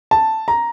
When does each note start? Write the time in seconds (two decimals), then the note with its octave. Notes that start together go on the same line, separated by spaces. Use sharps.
0.11 A5
0.48 A#5